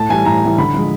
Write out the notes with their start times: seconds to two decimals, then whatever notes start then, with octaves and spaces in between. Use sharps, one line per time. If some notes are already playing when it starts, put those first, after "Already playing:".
Already playing: A2 A5
0.09 E3 G3 G#5
0.25 A2 A#5
0.42 E3 G3
0.58 D3 B5
0.74 F3 G#3